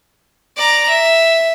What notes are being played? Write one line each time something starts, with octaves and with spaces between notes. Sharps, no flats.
D5 A#5
E5